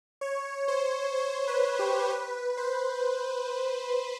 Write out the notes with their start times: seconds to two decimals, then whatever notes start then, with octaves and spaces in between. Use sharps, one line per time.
0.21 C#5
0.68 C5
1.16 C5
1.47 B4
1.79 G4
2.10 B4
2.57 C5